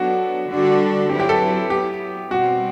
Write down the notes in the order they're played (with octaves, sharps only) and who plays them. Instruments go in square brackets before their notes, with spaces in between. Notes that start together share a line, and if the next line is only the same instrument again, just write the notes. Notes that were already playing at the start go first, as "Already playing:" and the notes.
Already playing: [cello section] F#3 B3 D4 A4 [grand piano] F#4
[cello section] D3 G3 D4 F#4 A4
[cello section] F#3 C4 E4 B4 [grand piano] G4
[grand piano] G4
A4
[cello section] F#3 B3 E4 [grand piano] G4
[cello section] B2 G3 C4 [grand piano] F#4